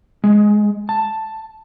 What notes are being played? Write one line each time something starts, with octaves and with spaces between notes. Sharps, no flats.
G#3
A5